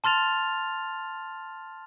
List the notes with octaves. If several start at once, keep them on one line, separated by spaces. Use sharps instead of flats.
A5 C6 F6 A6 F7